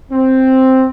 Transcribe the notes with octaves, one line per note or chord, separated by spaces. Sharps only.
C4